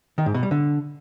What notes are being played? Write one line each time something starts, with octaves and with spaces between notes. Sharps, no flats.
D#3
G#2
B2
G3
D3